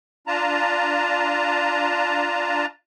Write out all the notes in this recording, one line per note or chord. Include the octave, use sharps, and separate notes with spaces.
D4 F4 A5 A#5